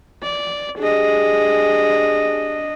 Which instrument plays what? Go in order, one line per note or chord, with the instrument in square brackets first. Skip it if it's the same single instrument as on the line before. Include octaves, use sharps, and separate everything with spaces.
[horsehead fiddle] D5
[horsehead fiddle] D4 D#5 [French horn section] G4 G#4